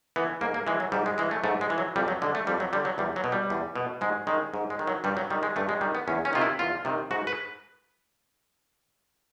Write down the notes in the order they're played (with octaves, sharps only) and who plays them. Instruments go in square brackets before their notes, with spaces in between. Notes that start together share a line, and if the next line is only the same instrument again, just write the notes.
[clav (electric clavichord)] E3 B3
G#2 A#3
A#3
E3 G#3
F#3
G#2 G3
G#3
E3 G#3
A3
G#2 A3
G#3
E3
F#3
F2 G3
F#3
D3 G#3
A3
F2 G3
F#3
D3 G3
F#3
E2 G3
F#3
B2
G3
E2
B2
G#2 G#3
D#3 G#3
G#2
G#3
D#3
F#3
G2 G3
F#3
D#3 G3
G#3
G2 A3
G#3
D#3 G3
B3
E2 C#4
C#4
C3 D#3 F4
E4
E2 F4
C3 D#3
G#2 F#4
B4